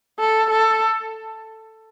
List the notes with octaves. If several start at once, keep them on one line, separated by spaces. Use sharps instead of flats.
A4
A4